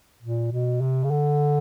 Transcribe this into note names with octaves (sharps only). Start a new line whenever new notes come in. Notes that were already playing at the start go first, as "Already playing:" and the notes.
A#2
B2
C3
C#3
D3